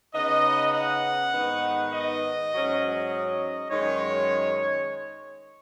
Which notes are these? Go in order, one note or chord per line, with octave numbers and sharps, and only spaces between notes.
C#3 B3 D#4 D#5
F#5
G#2 D#3 B3 D#4
D#5
G#2 F#3 C#4
D#5
F#2 D#3 G#3 D#4 C#5